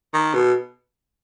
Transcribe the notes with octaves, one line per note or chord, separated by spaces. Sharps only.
D#3
B2